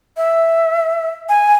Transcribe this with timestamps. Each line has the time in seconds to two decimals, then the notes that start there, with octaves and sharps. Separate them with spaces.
0.17 E5
1.29 G#5